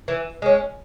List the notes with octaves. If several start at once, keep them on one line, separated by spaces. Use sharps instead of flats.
E3
G#3 C#4